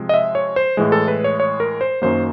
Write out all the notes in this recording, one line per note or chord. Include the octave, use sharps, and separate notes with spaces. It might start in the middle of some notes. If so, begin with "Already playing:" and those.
Already playing: C3 F3 G#3
D#5
E5
C#5
C5
A2 E3 G#3
A4
B4
C#5
C#5
A#4
C5
F#2 D#3 F#3 A#3 C5